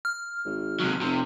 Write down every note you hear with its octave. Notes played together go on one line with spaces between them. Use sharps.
F6
G#1
C3 F#3
F1 C3